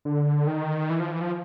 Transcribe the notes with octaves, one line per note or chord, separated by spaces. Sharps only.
D3
D#3
E3
F3
E3
F3